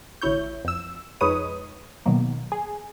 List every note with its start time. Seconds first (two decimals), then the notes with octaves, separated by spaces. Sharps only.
0.22 A1 D2 E4 C#5 G6
0.65 F2 E6
1.21 F2 G#3 D#4 B4 C#5 D#6
2.06 B2 D#3 F#3 A#3
2.52 G#4